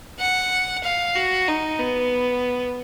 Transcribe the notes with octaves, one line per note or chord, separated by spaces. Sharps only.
F#5
F5
F#4
D#4
B3